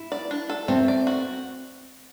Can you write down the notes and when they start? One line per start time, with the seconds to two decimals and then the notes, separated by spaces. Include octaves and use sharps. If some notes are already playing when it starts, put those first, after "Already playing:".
Already playing: E4
0.12 D5
0.31 D4
0.50 A4
0.68 A3 C4
0.88 D5
1.07 F#4